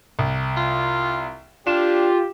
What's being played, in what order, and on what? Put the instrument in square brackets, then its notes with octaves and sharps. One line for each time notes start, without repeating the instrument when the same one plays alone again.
[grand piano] C2
[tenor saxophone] F4
[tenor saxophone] D4 [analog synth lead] F4 [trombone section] G4 [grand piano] E7